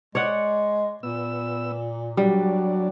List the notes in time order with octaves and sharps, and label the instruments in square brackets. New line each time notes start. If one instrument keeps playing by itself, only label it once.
[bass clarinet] G#3 [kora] C#5 D5 F#5
[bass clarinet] A#2 [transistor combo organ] B3 E6
[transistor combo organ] F#3 D4 [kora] G3